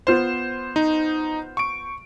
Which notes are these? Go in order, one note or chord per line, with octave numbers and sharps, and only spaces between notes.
B3 F4 C5
D#4
C#6 D7